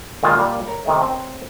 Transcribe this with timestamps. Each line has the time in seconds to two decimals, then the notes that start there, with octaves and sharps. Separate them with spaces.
0.23 A#2 D#3 G#3 F4
0.37 A#2 G3
0.68 A#4 C#5
0.86 C3 D#3 A3
1.02 C4 C#5